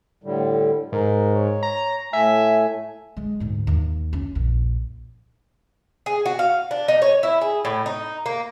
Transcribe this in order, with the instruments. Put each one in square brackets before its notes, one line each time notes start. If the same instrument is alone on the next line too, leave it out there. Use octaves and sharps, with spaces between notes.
[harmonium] A2 D3 G3
[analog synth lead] G#2 [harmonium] A#4
[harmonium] C#5
[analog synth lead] A#5
[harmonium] A2 A3 G#5 [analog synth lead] E5
[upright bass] G#3
D2 G#2
D#2
C#4
A#1 F2
[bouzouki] G#4
F#4
F5
D4
D#4
C#5
E4
G#4
A2
D#4
A#3